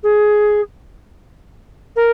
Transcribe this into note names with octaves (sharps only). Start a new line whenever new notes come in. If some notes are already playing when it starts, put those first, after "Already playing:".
G#4
A#4